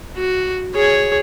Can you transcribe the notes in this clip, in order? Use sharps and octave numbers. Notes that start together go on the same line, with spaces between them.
F#4
G#4 C#5